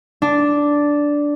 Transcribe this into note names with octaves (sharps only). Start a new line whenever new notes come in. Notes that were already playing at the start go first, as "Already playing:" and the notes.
D4